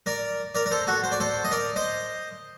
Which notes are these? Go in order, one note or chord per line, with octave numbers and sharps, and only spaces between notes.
A#4 D5
A#4 D5
A#4
A4 C5
F#4 A4
C5
D5
A4 C5
D#5
A#4 D5
C5 D#5